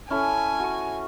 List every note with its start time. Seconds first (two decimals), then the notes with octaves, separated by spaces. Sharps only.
0.10 C#4 E4 A4 G#5
0.60 F#4 C#6